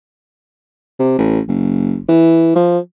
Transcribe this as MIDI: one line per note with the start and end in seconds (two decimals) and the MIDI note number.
0.99 1.14 48
1.18 1.40 33
1.48 1.99 30
2.09 2.52 52
2.55 2.78 53